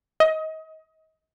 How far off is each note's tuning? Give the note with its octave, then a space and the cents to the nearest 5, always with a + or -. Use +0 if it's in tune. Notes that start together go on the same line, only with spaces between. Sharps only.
D#5 +25